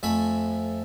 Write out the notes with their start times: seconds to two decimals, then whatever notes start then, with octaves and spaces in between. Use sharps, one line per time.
0.03 F2 A3 G#5 B5